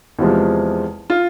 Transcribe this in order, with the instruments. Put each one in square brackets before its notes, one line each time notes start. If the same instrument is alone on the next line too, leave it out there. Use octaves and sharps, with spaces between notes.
[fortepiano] E2 C3 F3 G#3
[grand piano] F4